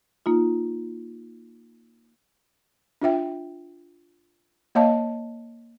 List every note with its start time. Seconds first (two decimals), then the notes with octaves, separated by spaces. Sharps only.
0.26 A#3 D#4 F4
3.02 D4 F4 E5 G5
4.75 A#3 C#5 D#5 F5 A5